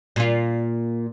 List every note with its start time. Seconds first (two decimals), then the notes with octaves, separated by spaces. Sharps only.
0.16 A#2 F4